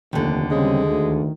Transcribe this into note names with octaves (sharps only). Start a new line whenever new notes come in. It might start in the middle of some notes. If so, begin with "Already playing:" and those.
F1 D#2 D3
C#3 G3 G#3 C4
D2 D#3